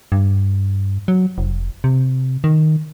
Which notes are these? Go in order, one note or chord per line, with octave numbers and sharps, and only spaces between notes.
G2
F#3
F1
C3
D#3